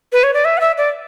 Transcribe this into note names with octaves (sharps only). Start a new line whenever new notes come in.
B4
C#5
D5
E5
F#5
E5
D5